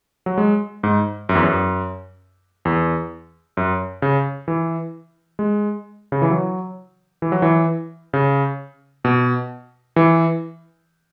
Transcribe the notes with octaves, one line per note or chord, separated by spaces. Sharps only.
F#3
G#3
G#2
F#2
E2
F#2
E2
F#2
C#3
E3
G#3
C#3
E3
F#3
E3
F#3
E3
C#3
B2
E3